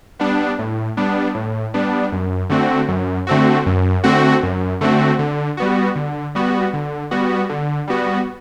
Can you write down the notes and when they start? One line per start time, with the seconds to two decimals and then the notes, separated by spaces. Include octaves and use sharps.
0.19 G3 B3 D4
0.59 A2
0.97 G3 B3 D4
1.35 A2
1.74 G3 B3 D4
2.12 F#2
2.50 D3 A3 C4 F#4
2.88 F#2
3.27 D3 A3 C4 F#4
3.66 F#2
4.04 D3 A3 C4 F#4
4.43 F#2
4.81 D3 A3 C4 F#4
5.19 D3
5.57 G3 B3 F#4
5.96 D3
6.35 G3 B3 F#4
6.73 D3
7.11 G3 B3 F#4
7.49 D3
7.87 G3 B3 F#4